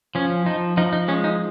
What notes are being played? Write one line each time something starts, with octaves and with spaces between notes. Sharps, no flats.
F3 C#4
F3 D#4
F3 D#4
D#4
G#3 C#4
D#4